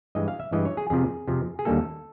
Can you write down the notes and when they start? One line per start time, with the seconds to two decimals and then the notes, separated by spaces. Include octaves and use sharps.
0.15 G2 E3 G#3 D#5
0.28 F5
0.40 E5
0.53 G2 E3 G#3 D#5
0.65 C#5
0.77 G#4
0.90 F2 C3 F3 G#4
1.28 F2 C3 F3
1.59 G#4
1.65 D#2 D3 G3 A#3 A4